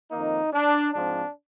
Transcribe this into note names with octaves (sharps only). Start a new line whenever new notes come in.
F2 D#3 A#3 D#4
D4
G#2 F3 C4 D4